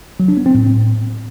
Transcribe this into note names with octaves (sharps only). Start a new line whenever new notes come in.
F#3
D4
B3
C4
A2